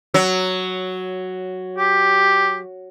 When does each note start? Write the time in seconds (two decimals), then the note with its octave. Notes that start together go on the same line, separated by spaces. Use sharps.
0.14 F#3
1.78 G4